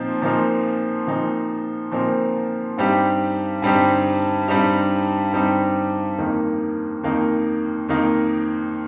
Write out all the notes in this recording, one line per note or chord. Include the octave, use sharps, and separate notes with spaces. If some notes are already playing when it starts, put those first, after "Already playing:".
Already playing: A#2 F3 C4 D#4
A#2 F3 C4 D#4 A#4
A#2 F3 C4 D#4 A#4
A#2 F3 C4 D#4 A#4
G2 G3 C4 D#4 G4
G2 G3 C4 D#4 G4
G2 G3 C4 D#4 G4
G2 G3 C4 D#4 G4
F2 D#3 A#3 D#4
F2 D#3 A#3 D#4
F2 D#3 A#3 D#4